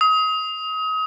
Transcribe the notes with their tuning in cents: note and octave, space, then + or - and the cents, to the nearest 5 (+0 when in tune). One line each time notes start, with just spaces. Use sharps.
D#6 +30